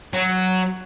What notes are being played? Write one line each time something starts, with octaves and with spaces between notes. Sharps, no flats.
F#3